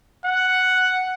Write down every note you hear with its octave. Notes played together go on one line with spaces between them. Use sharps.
F#5